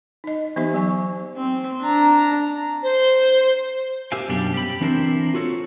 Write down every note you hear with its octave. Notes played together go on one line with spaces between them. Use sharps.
D#4 D#5
E3 B3 D#4 G4 C5 E5
F#3 G#5 C#6
C4
D4 A#5
C5
G4 A#4 C5 E5 F5 G#5
F#2 B2 G3 D4 G4
G4 B5
E3 C4 D4 E4 A#4 C5
F4 F#4 A4 C#5